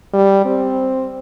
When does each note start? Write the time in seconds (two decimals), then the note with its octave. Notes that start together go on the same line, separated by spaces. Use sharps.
0.14 G3
0.45 C4